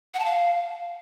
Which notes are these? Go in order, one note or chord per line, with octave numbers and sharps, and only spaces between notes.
F#5
A5
F5